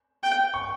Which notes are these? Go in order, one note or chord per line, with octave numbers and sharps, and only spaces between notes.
G5
C#6